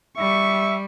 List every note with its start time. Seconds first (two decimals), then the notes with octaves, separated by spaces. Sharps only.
0.18 G3 E5 C#6